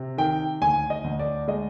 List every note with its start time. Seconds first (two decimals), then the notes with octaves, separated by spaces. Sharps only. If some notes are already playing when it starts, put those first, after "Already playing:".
Already playing: C3
0.18 D#3 G5
0.61 D2 G#5
0.90 D#5
1.04 D2
1.19 D5
1.48 G#3 D#5